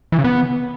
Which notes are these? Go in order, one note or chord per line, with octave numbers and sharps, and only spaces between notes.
E3
C#3
B3